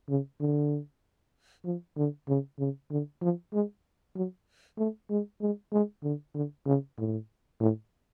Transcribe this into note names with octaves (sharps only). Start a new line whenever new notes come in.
C#3
D3
F3
D3
C#3
C#3
D3
F3
G#3
F#3
A3
G#3
G#3
G#3
D3
D3
C#3
A2
A2